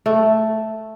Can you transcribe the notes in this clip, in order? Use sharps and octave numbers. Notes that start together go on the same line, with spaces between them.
A3